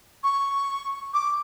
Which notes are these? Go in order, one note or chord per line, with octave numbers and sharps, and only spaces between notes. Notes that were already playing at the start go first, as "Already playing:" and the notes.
C#6
D6